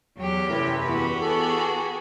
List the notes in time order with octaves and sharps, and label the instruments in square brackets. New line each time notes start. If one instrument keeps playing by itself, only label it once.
[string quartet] E2 G4 [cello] F#3
[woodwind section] F#2 C3 E4 [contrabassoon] A2 [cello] B4
[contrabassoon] E2 [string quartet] F#4 G4
[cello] B3 G#4 [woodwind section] A4